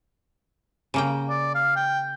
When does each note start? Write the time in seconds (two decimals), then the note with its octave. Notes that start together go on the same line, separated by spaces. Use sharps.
0.94 C#3 A#3 G5
1.29 D5
1.55 F5
1.76 G5